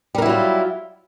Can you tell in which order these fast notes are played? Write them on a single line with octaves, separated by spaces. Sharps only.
G3 A#4 E4 F#3 F4